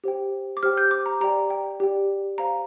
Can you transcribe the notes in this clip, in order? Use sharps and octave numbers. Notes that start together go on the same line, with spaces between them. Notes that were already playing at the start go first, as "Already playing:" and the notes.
G4 C5 G5
D6
G4 C5 G5 F6
G6
D6
A#5
G4 D5 G5 A#5
G5
G4 D5 G5
C5 F5 A#5